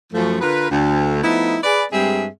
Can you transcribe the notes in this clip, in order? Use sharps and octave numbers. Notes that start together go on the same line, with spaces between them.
F#2 F3 A3
D3 F4 A#4 B4
D2
F3 A3 B3 D#4 E4
G#4 B4 D5
G2 G3 G#3 C4 G#4 E5